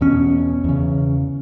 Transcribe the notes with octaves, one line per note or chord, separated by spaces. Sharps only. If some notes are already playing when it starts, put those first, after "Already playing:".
E2 B2 C#4
E2 C#3